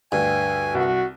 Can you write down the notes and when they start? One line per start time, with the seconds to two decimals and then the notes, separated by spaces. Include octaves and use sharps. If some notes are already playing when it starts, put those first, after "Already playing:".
0.12 D2 G2 G#5
0.75 C2 F#4